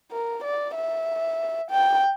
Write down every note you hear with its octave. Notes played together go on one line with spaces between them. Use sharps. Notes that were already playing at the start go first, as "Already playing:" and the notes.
A#4
D5
E5
G5